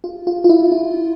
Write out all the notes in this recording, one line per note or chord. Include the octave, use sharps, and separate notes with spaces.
F4
F4
F4
E4
E4